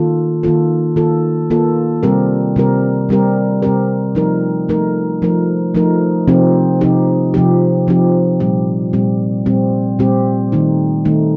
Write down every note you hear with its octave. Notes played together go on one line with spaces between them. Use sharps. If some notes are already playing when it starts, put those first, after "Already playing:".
Already playing: D#3 A#3 F4 A4
D#3 A#3 F4 A4
D#3 A#3 F4 A4
D#3 A#3 F4 A4
C3 G3 C4 G4 A#4
C3 G3 C4 G4 A#4
C3 G3 C4 G4 A#4
C3 G3 C4 G4 A#4
F3 A3 D#4 A#4
F3 A3 D#4 A#4
F3 A3 D#4 A#4
F3 A3 D#4 A#4
C3 F3 C4 D#4 G4
C3 F3 C4 D#4 G4
C3 F3 C4 D#4 G4
C3 F3 C4 D#4 G4
A#2 G3 C4 G4
A#2 G3 C4 G4
A#2 G3 C4 G4
A#2 G3 C4 G4
D#3 A3 D#4
D#3 A3 D#4